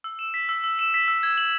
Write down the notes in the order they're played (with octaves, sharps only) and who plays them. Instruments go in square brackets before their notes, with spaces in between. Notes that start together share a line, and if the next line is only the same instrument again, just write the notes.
[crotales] E6
E7
B6
E6
E6
E7
B6
E6
G#6
F#7